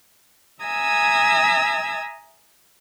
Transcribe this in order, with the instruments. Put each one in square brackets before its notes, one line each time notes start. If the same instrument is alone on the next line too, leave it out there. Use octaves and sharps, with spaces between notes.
[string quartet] E5 G#5 A#5 D#6 E6 G#6